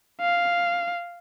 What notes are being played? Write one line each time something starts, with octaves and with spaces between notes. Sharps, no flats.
F5